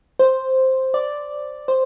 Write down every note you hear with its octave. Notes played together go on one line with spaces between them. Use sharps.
C5
D5
C5